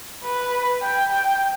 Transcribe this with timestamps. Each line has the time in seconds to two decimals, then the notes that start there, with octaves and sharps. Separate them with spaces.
0.24 B4
0.82 G5
1.11 G5